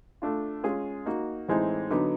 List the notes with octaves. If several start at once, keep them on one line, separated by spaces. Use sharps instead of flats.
A3 D4 F4
G#3 C#4 F4 G#4
A#3 D#4 F#4
A2 E3 G#3 C4 D#4
D3 F#3 B3 D#4